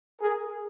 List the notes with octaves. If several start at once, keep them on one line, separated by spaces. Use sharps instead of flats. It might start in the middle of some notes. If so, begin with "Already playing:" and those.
G#4 A#4